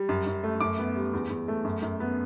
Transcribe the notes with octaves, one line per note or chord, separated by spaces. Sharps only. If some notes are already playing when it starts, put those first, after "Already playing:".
Already playing: G3
F#2
F#2
A3
F#2 D6
B3
G3
E2
E2
A3
F#2
F#2
B3